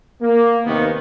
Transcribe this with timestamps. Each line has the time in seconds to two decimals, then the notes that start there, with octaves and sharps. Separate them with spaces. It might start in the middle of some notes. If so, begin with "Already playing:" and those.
0.21 A#3
0.65 D#2 C3 D#3 B3